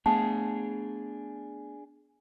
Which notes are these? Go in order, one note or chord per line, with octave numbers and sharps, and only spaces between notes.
A3 B3 D4 G#4 A5